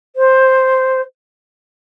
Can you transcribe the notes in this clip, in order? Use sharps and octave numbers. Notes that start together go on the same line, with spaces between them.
C5